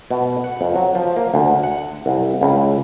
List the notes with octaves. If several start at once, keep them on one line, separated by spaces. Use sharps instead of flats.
B2
F#5
F2
F#3
F3
A#3
D2
F#5
C2
C#2